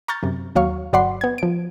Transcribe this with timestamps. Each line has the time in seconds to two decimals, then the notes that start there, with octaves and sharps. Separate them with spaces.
0.08 A#5 C#6 F6 G6 A6
0.23 F#2 C3
0.55 D#2 F#3 F5 C#6
0.93 G1 F#3 D5 F#5 B5 C6
1.21 B3 G#6
1.38 F3 D7